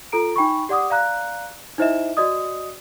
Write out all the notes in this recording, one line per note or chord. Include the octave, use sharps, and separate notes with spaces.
F4 A4 A#5 D7
D#4 G5 B5 C#6
G4 D5 F#5 D6 D#6
D5 F5 A#5 F#6
D#4 E4 C5 D#5 E5 E7
F#4 D5 D#5 D#6